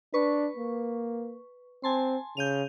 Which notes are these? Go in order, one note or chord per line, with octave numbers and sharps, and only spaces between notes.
D4 B4 C#6
A#3
C4 G#5 A5 C6
C#3 G6 D#7 F7